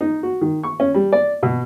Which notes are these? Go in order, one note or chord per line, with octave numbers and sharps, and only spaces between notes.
D#4
F#4
D#3
C#6
C#4
G3
D5
B2